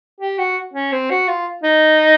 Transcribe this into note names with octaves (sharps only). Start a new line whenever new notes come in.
G4
F#4
C#4
C4
F#4
F4
D#4